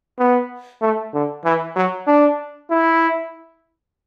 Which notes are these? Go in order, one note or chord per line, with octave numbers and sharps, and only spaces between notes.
B3
A3
D3
E3
F#3
D4
E4